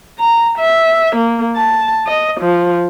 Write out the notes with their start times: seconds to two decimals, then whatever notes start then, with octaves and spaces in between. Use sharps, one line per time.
0.19 A#5
0.58 E5
1.16 A#3
1.56 A5
2.06 D#5
2.40 F3